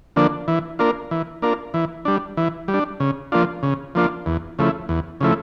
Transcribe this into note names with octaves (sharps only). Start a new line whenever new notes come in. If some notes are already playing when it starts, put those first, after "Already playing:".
D3 F3 A#3 D4
E3
A#3 D4 F4 A#4
E3
A#3 D4 F4 A#4
E3
G3 D4
E3
G3
D4
C#3
F3 A#3 D4 F4
C#3
F3 A#3 D4 F4
E2
C#3 F3 A3 E4
E2
C#3 F3 A3 E4